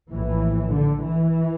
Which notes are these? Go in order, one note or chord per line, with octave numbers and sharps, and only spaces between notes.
A#1 A2 E3
D3
E3